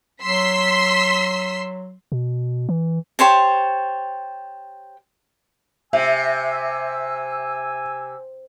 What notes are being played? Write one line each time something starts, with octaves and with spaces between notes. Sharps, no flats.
F#3 C6 E6 B6
B2
E3
G4 C5 C#5 A5
C3 E5 G#5 E6